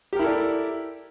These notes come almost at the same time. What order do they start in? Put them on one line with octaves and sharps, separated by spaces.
G4 A#4 E4 A4 D5